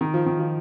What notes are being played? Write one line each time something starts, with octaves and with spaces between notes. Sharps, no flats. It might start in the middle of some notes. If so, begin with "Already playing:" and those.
D#3
F3
D#3
F3